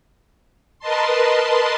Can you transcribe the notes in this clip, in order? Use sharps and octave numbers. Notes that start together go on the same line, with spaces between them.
A#4 B4 D#5 A5 C6